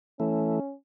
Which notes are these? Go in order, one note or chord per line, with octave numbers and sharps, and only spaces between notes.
E3 A3 C#4